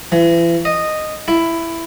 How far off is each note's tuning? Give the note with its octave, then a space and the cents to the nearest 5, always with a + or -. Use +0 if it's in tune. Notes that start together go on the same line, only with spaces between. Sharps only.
E3 +40
D#5 -10
E4 +10